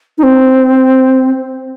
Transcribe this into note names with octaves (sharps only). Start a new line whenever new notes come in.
D#4
C4